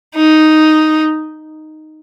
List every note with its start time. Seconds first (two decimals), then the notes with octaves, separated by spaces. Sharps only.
0.15 D#4